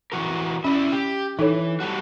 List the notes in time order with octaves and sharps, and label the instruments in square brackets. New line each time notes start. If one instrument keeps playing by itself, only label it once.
[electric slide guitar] E3 F#4 A#4
[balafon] C#4 [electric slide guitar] E4 D5 E5
[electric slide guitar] G4
[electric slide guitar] E3 [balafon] D#4 A4 C#5
[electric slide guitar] G3 A3 F#4